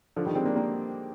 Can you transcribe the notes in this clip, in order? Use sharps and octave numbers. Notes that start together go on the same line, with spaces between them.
D3 F3
D#3 G3
G#3 C4
A#3 D4
G3 A#3